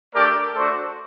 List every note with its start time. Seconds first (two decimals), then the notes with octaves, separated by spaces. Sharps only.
0.14 A3 D4 G4 A#4 D5
0.54 A3 D4 F#4 A4 C5